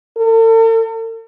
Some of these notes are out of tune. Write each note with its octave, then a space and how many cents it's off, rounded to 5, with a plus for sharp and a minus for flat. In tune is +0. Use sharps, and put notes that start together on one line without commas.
A4 +45